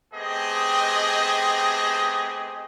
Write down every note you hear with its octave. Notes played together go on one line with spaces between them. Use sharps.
A3 B3 C4 G4 G#4 D#5